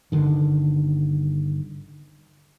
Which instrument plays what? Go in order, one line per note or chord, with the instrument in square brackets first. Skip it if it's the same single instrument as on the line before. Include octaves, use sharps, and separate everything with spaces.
[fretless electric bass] G1 C#2 D3 D#3